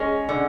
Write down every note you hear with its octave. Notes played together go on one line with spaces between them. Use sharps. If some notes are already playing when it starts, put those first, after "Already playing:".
Already playing: G#3 C#4
D3